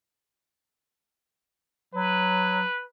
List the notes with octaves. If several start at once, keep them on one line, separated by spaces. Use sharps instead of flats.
F#3 B4